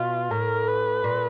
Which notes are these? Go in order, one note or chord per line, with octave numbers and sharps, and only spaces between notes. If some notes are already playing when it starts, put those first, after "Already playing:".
Already playing: B2 F4
A2 A#4
B4
A#2